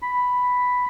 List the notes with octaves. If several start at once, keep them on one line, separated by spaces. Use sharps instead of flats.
B5